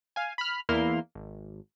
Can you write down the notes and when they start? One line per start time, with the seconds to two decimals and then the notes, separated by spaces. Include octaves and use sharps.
0.16 F5 G#5
0.38 B5 F6
0.69 E2 A#3 E4 C6 F6
1.15 G#1